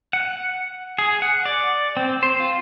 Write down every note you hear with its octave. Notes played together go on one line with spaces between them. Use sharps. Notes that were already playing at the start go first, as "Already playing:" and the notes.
F#5
G#4
F#5
D5
C4
C5
F4